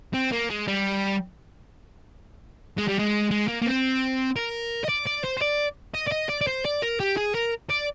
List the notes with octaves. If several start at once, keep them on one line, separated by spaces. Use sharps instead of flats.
C4
A#3
G#3
G3
G#3
G3
G#3
G#3
A#3
A#3
C4
A#4
D#5
D5
D5
C5
C5
D5
D#5
D5
D#5
D5
D5
C5
D5
A#4
G4
G#4
A#4
D5